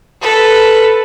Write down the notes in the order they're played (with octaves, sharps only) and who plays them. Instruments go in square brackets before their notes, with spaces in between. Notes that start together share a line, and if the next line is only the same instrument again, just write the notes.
[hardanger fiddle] A4 B4